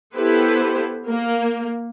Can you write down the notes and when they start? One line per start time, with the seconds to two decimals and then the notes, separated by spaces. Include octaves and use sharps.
0.14 B3 E4 G4 A4 B4 C5
1.07 A#3